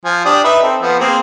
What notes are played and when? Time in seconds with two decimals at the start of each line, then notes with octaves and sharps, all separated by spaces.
0.05 F3 G#5
0.25 D4 G4 D#6
0.44 D#4 B4 E5
0.63 C4 A4
0.82 F3 B3
1.00 A#3 C4 G#4